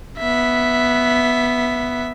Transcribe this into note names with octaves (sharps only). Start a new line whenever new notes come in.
B3 E5